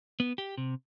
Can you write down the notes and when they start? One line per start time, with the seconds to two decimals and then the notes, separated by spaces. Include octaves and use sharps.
0.20 B3
0.38 G4
0.58 C3